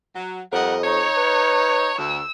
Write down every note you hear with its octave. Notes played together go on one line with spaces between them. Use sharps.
F#3
F2 G3 A#4 D#5 F#5
D#4 C#5
B4
D2 E6